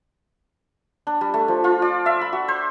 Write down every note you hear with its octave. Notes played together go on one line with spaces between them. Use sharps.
D4
G3
A3
F3
F4
D5
E5
B5
F#4
C5